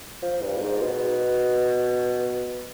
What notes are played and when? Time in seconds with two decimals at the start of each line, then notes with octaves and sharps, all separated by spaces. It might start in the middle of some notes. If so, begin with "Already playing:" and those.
0.22 F3
0.43 G2
0.56 B2
0.62 G#2
0.82 B2